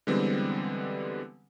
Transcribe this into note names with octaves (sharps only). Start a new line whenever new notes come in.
D3 E3 G3 G#3 B3 C4